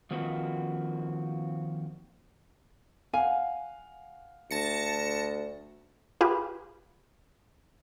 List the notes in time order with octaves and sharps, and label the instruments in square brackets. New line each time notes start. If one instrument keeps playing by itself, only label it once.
[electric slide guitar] D#3 F3 A#3 C4 F#4 B4
[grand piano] F5 F#5 [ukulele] G#5
[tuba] D2 [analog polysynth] A5 A#6 C#7
[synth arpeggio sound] F4 G4 G#4 B4